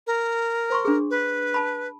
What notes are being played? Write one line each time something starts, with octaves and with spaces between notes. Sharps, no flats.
A#4
C5 C6 C#6
D4 G#4
B4
A5 B5